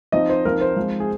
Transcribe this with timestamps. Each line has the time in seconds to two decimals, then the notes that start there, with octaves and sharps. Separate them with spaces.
0.12 F3 C4 D#4 D#5
0.29 C5
0.45 F3 C4 D#4 A#4
0.61 C5
0.76 F3 G#3 C4
1.00 G#4